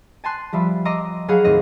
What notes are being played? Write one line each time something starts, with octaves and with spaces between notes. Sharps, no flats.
G#5 A5 C6 F#6
F3 G3 E5 B5
D#5 A#5 C6 D6 E6
F#3 G#4 F5 F#5 B5
D#2 A2 C4 D#5